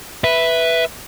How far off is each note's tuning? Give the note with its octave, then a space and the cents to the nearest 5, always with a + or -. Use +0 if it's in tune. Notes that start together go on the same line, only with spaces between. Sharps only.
B4 +0 E5 +0